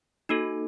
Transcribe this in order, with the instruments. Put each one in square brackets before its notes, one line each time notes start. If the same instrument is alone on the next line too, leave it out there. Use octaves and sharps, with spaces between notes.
[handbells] A#3 D#4 F#4 A4